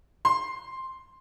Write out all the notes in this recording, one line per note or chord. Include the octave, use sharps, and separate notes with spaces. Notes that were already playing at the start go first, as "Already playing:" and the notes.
C6